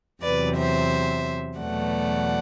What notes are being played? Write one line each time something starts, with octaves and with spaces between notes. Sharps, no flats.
E2 C3 F#3 B4 D5
C5 E5
E2 B2 F#3 A3 D5 F#5